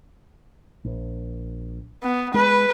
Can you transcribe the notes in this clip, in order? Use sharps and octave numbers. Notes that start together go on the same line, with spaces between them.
A#1
B3
G#3 B4